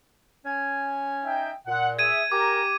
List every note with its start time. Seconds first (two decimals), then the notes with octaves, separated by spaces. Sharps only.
0.46 C#4 G#5
1.26 D#4 E5 G5
1.67 A#2 F#5
1.99 G#4 E5 G#6 D#7
2.32 G4 A#4 G#5 A#5 D6